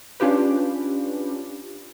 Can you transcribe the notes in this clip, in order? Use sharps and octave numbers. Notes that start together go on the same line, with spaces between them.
C#4 D4 F4 G4 B4